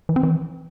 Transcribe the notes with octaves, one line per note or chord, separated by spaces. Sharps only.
E3
C4
E3